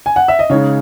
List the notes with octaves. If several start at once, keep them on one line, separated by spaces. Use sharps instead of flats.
G#5
F#5
E5
D#5
C#3 G#3 D#4 C#5